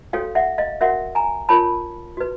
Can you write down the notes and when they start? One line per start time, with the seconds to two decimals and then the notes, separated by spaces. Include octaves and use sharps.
0.13 C#4 F#4 A4 C#5 F5 G5
0.35 E5 F#5
0.58 D#5 F5
0.81 C#4 F#4 A#4 E5 F#5
1.15 G#5 A#5
1.49 F4 A#4 C#5 A5 B5
2.17 F#4 B4